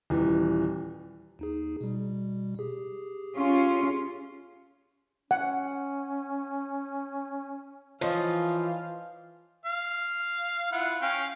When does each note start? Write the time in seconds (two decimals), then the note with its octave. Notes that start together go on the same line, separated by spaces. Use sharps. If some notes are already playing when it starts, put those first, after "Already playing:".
0.10 D#1 E3
1.39 D#2 D#4 G#4
1.81 B2 G3
2.59 G4 G#4
3.36 C#4 F4
5.31 C#4 F#5
8.01 E3 F3 C#5 D#5 F5
9.65 F5
10.72 E4 F4 F#5
11.01 C#4 F5 G5